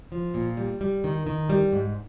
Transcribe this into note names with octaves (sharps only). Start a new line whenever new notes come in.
F3
A#2
G3
G3
D#3
D#3
G3
G#2